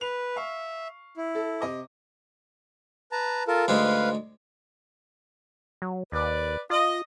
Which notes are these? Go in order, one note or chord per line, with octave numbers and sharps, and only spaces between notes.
B4 F7
E5 F5 C#6
E4
A4
C3 D#5 D6
B4 A5 A#5
F4 A4 A#4
D2 G#2 G#3 B4 F5
F#3
D#2 B4 D5
F4 D#5